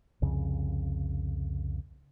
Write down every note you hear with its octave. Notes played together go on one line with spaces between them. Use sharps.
C2 F2 C#3